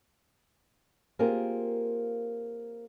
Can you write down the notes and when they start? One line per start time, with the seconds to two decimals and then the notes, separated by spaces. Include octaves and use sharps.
1.19 A#3 C4 F4 G4 G#4 A#4